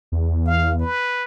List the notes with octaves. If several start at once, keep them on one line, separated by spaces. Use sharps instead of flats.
E2
F5
B4